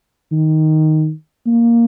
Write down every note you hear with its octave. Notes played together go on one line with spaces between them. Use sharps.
D#3
A#3